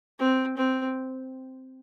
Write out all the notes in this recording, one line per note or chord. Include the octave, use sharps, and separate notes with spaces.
C4
C4